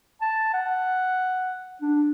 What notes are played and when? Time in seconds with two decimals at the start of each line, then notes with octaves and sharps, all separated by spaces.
0.22 A5
0.54 F#5
1.82 D4